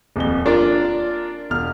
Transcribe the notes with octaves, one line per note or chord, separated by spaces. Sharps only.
D#1 F2 G7
D4 F4 A#4 D5
E1 F6